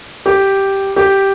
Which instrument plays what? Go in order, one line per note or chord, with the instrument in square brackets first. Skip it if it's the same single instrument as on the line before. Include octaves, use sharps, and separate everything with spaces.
[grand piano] G4
G4